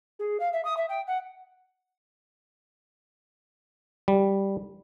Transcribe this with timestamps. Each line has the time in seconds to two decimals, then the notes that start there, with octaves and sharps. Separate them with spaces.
0.19 G#4
0.40 F5
0.53 E5
0.65 D#6
0.77 E5
0.89 G5
1.07 F#5
4.08 G3